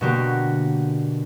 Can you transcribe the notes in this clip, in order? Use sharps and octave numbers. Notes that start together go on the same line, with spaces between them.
B2 D3 A#3 F#4 G4 A#4